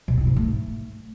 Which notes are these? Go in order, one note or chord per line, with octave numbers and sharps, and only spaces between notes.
B2
C4
G#2
A3